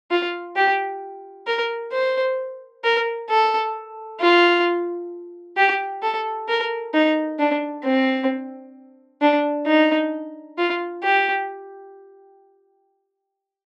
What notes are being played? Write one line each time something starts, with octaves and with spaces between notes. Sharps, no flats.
F4
G4
A#4
C5
A#4
A4
F4
G4
A4
A#4
D#4
D4
C4
D4
D#4
F4
G4